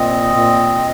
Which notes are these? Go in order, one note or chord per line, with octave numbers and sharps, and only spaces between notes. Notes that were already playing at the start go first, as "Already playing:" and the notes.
Already playing: A#2 C4 D#5
A#2